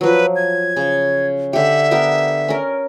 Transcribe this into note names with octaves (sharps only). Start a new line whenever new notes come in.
F3 F#3 B4
G#6
C#3
D3 G4 E5
B3 G4 A#4
C#4 A#4